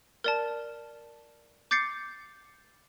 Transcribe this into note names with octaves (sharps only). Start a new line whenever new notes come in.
A#4 D5 A5
D6 G6 A6 C7 C#7